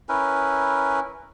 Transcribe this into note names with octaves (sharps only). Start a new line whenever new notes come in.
C#4 E4 A#4 B4